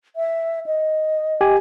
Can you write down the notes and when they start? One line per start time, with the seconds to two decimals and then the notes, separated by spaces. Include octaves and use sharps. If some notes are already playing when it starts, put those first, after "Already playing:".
0.16 E5
0.66 D#5
1.41 G4 G#5